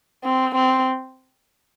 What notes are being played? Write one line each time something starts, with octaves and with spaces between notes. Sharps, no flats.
C4
C4